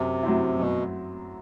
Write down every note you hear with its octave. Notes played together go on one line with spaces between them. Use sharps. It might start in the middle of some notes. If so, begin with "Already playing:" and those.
Already playing: F#2 C3
F#3 C4 E4
F#2 B2